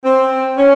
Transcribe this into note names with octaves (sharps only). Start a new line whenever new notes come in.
C4
C#4